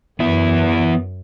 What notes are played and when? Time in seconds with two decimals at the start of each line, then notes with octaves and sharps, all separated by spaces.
0.20 F#2 E3 B3 E4